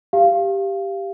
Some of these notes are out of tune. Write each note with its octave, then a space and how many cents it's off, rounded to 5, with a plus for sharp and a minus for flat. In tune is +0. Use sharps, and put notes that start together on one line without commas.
G4 +0 F5 -15